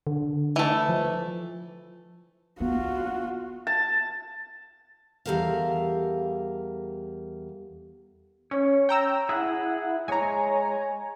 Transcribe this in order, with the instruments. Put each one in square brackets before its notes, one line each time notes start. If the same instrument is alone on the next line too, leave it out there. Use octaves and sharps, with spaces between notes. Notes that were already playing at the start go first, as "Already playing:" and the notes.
[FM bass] D3
[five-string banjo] E3 A3
[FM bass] F3
[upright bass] B3 [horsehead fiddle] F4 F#4
[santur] A5
[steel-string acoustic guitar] E2 G3 A4 A#4 F5
[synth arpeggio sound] C#4 [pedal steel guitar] C#5
[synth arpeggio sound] G5 A#5 E6
[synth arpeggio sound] E4 [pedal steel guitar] G#4 F#5
[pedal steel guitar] G#3 C#5 [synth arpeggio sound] G#5 A#5